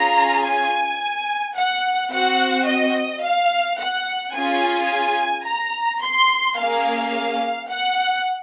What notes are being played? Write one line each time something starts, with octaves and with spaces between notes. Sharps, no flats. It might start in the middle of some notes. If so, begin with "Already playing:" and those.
Already playing: C#4 F4 G#4 A#5
G#5
F#5
C4 F#4 F#5
D#5
F5
F#5
C#4 F4 G#4 G#5
A#5
C6
A#3 C#4 G#4 F5
F#5